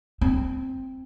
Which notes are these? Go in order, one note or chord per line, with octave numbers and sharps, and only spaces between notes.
C4